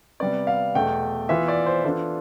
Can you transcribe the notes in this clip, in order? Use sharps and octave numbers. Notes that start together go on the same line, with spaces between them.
C3 G3 B3 D5
F5
E2 B2 A3 G5
E3 B3 F4 E5
D5
C5
E3 B3 D4 F4 A4